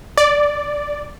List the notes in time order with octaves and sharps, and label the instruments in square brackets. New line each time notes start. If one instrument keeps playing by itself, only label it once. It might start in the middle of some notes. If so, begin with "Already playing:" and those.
[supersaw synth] D5